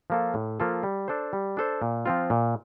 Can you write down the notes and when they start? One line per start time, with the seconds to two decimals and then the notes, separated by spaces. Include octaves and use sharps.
0.10 F3 A#3 F4 A4
0.34 A2
0.60 F3 A#3 F4 A4
0.83 G3
1.08 D4 A4 C5
1.33 G3
1.57 D4 A4 C5
1.82 A#2
2.06 F3 C4 F4
2.30 A#2